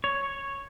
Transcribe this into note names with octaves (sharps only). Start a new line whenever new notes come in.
C#5